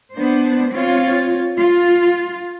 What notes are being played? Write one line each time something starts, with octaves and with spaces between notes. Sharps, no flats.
B3 D4 C5
C4 F4 C#5
F4